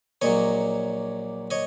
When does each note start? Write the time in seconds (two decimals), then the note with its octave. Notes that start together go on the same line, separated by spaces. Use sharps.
0.22 A#1 A#2 F#3 C#5 D#5
1.51 C#5 D#5